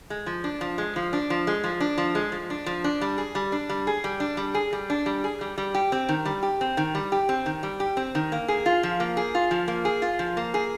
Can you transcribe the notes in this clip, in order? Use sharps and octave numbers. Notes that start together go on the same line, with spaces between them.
G#3
F3
D4
F3
G#3
F3
D4
F3
G#3
F3
D4
F3
G#3
F3
D4
F3
D4
G3
G#4
G3
D4
G3
G#4
G3
D4
G3
G#4
G3
D4
G3
G#4
G3
G3
G4
C4
D#3
G3
G4
C4
D#3
G3
G4
C4
D#3
G3
G4
C4
D#3
A#3
G#4
F4
F3
A#3
G#4
F4
F3
A#3
G#4
F4
F3
A#3
G#4